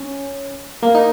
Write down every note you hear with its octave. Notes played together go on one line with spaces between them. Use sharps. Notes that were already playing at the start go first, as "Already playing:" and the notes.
Already playing: C#4
A#3
D#4